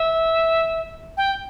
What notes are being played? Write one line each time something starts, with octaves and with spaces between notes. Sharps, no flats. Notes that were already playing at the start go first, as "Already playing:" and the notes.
Already playing: E5
G5